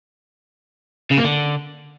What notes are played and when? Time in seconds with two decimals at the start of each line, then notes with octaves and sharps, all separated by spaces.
1.11 C#3
1.18 A#3
1.24 D3